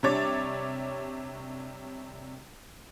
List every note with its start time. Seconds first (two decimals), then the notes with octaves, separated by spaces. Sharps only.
0.03 C3 G3 D4 C#5 D6 A6